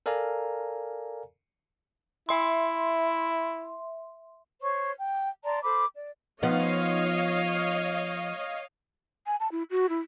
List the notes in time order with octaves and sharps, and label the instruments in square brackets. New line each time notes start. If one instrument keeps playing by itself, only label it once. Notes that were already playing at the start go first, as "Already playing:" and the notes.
[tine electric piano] A4 A#4 D5 F5 G#5 A#5
[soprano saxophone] E4 [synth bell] E5 C6
[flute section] C5 C#5 C#6
G5
D5 A5 A#5 C6
A4 C5 B5 D6
D5
[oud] F3 B3 D#4 [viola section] C#5 D#5 F5
[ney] G#5
A5
E4
F#4
E4